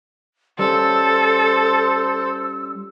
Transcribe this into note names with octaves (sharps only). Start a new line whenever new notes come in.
G3 C#4 F4 A4 C5 E6